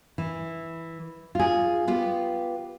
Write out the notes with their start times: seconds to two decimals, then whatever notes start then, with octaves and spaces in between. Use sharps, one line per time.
0.18 E3
1.35 F4 G#4
1.88 B3 F4 G4